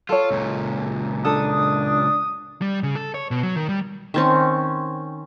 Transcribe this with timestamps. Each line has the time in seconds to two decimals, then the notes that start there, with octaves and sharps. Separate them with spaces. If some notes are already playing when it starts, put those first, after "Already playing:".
0.09 F4 A4 C#5
0.31 C#2 A#2
1.25 D4 A4 D#6
2.62 G3
2.83 C#3
2.95 A4
3.14 C#5
3.31 B2
3.43 F#3
3.55 D#3
3.69 G3
4.14 D#3 C4 C#4